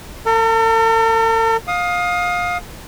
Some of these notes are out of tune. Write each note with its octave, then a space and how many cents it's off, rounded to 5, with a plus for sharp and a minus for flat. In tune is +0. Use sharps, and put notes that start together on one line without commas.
A4 +45 A#5 +0
F5 +25 D#6 +0